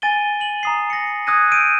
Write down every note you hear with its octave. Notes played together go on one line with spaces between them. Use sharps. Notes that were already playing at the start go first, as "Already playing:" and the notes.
G#5 A6 D#7 G7
D#7 F#7
A#5 D#6 C7
A#6 C#7
D#6 E6 F#6 G#6 A#6 D#7
G6 D7 D#7